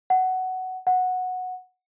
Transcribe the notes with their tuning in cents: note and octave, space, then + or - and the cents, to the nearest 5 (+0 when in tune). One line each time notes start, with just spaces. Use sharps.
F#5 +10
F#5 -10